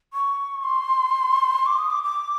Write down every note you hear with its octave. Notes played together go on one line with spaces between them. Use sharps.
C#6
C6
D6
D#6
D6
D6